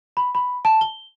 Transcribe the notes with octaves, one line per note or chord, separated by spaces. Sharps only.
B5
B5
A5
G7